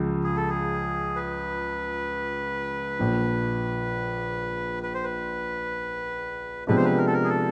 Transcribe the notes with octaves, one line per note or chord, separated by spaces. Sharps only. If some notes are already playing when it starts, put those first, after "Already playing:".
Already playing: C#2 C#3 F3
G#4
A4
G#4
B4
A#1 A#2 F3
B4
C5
B4
C3 F3 G#3 B3 D4 B4
C5
B4
A#4
A4
A#4
G#4
A4